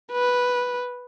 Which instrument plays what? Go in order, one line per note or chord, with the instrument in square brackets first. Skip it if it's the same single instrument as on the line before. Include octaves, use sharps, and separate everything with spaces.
[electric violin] B4